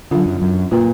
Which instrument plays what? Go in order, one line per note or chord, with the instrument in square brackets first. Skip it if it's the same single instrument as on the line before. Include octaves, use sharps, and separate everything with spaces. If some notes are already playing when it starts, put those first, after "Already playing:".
[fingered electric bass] D3 [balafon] F#3 D4 F4
[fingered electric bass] F#2
F#2
[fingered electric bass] A#2 [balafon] A#3 F4 B4